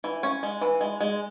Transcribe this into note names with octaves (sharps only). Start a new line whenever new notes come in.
E3
C#4
G#3
E3
G#3
G#3